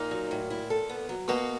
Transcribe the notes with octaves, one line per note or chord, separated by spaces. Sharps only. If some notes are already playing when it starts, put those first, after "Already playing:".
Already playing: A#2 A#3 D#4
F#3
A2
E4
A4
B3
F#3
B2 A#3 B3